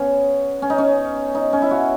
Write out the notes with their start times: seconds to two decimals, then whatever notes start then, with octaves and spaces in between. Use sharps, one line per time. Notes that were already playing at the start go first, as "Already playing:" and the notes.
Already playing: B3 C#4
0.62 C#4
0.70 D#4
0.78 C#4
1.35 D#4
1.53 C#4
1.62 E4
1.71 F#4